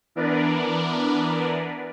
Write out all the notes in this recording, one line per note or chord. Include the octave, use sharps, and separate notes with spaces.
E3 B3 D4 A#4 B4 D5